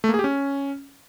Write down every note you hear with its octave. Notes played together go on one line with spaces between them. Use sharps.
A3
A#3
G#4
G4
C#4